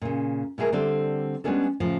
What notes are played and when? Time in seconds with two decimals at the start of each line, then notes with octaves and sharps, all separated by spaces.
0.01 A#2 C#3
0.58 B2 G#3 E4 G#4 A#4
0.72 D3 G3 C4 A4 D5
1.44 G3 G#3 B3 C#4 D4 A4
1.80 A2 C#3 F3